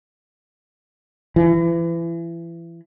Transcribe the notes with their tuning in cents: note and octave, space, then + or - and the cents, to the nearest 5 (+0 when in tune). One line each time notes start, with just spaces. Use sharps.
E3 +30